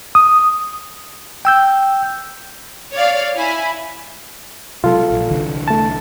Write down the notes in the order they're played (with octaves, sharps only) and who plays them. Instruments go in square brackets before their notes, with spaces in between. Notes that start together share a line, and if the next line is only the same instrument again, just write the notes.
[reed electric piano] D#6
[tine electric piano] G5 E6 G6
[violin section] C#5 D5 F5
E4 G#5 B5
[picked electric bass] C3 F#3 G#3 [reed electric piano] F4 A4
[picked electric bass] A#1
C2 D3 E3
[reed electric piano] A3 A5